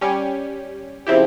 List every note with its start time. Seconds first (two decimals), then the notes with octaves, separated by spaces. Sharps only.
0.01 G3 C#4 G4
1.07 C#3 F3 C4 E4 G4